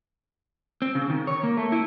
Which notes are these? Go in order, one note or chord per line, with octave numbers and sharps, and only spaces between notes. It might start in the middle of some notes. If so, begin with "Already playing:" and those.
C4
C#3
D#3
C#5
A#3
A3
E4